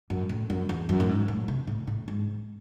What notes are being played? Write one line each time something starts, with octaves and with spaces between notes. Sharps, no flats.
F#2
A2
F#2
E2
F#2
A2
G#2
A2
C3
A2
A2
G#2